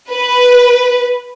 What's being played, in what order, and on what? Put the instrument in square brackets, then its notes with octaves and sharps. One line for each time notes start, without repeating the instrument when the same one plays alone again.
[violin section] B4